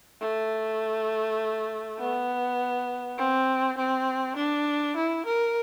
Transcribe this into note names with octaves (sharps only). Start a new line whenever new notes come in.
A3
B3
C4
C4
D4
E4
A#4